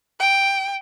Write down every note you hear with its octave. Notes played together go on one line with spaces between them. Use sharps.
G5